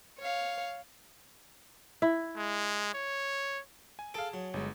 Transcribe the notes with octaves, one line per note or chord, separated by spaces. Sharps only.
C#5 F5
E4
G#3
C#5
G#5
G#4 A4 F5 A5 D7
F#3
G1 G#3